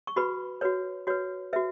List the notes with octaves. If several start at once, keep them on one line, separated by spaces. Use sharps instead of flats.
C#6
F#4 B4 B5
F#4 B4 C#5
F#4 B4 C#5
F#4 B4 E5